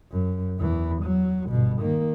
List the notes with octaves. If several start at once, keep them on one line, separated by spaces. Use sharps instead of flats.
F#2
E2 E3
F#3
G1 B2
D#3 A#3